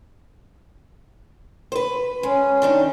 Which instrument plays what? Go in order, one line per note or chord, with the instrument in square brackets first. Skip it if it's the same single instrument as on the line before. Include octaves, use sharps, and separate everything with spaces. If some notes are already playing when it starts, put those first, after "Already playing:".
[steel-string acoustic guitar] B4 C5
[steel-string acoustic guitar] G#3 [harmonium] C#4
[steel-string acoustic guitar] D#3 D4 D#4